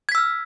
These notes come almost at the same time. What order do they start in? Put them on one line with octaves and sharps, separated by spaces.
G#6 B6 E6 F6